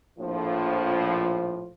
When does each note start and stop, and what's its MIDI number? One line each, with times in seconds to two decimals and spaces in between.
0.19 1.68 34
0.19 1.68 45
0.19 1.68 53